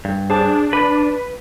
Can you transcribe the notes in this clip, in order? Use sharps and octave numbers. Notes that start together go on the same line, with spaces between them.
G2
D4 G#4 C5 A5
B4 B5